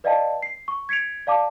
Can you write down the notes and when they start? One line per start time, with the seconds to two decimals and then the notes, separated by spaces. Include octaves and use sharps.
0.04 B4 D5 D#5 F5 G5 A5
0.42 C7
0.68 C#6
0.89 G#6 B6 C#7 D7 F7
1.27 D5 F5 A5 D6